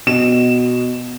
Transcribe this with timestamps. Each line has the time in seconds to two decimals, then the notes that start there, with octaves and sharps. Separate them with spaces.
0.07 B2 E7